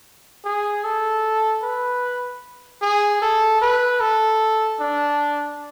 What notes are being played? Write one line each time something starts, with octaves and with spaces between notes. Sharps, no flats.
G#4
A4
B4
G#4
A4
B4
A4
D4